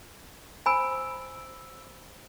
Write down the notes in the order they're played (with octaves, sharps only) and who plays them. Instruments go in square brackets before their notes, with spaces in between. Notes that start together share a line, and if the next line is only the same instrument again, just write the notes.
[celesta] C5 E6 D7 [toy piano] G#5 B5